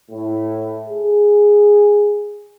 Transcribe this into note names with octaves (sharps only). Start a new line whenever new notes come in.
A2
G#4